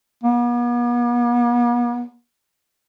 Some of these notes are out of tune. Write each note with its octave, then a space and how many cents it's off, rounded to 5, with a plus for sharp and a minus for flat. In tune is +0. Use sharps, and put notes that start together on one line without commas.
B3 -45